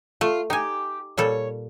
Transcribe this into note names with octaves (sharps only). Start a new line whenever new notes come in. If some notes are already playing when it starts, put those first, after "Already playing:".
A3 F4
D#4 G4 G#5
A#2 G3 A4 C#5